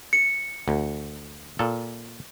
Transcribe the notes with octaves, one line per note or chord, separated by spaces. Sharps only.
C#7
D2
A#2 A4